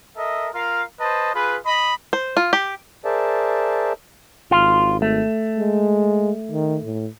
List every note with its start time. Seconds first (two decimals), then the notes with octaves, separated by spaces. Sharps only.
0.16 A4 A#4 D#5 E5
0.53 F4 A#4 F5
1.00 B4 C5 D#5 A5
1.34 F4 G#4 B4
1.66 D#5 B5
2.13 C5
2.37 F4
2.53 G4
3.05 G#4 A#4 C5 D5 E5 A5
4.51 G#1 F4
5.02 A3
5.58 G#3
6.51 D#3
6.84 A2